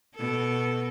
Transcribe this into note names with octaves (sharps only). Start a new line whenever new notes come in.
B2 A4